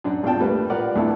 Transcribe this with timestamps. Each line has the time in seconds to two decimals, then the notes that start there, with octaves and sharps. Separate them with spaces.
0.04 F#2 D4
0.23 G#1 E2 D4 F4 G5 A5
0.41 G3 A3 A#3 B4
0.70 F4 A#4 B4 D5 F#5
0.95 D2 A3 B3 E4 A4